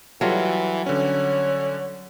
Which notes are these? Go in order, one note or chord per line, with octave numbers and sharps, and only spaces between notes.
E3 F#3 G3 F4 A4
D3 C#4 C#5